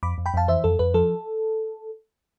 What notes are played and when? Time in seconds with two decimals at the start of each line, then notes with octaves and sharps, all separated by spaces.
0.03 F2 B5 D6
0.18 F2
0.26 G5 B5
0.34 F2 F5 A5
0.48 E3 C5 E5
0.64 F2 A4
0.79 F2 B4
0.94 F3 A4